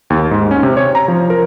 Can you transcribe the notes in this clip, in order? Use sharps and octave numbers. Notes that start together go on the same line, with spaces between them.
D#2
G#2
C#4
C3
C#5
A#5
F3
A#4